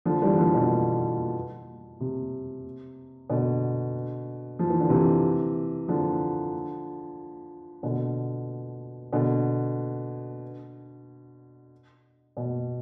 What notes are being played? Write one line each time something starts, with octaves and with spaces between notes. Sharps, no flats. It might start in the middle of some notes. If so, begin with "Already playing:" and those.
D3 F3
E3 G3
D3 F3
B2 D3
C3
B2 D3
F3
E3
D3
C3 E3
D3 F3
B2 D3
B2 D3
B2